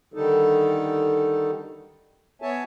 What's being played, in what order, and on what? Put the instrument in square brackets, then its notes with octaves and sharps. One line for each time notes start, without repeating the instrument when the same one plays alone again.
[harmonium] D3 D#3 G3 D#4 A4
B3 C#5 E5 G#5 A5